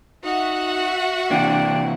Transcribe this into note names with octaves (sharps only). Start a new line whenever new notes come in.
D#4 F#4 E5 F#5
C3 E3 A#3 D4 G5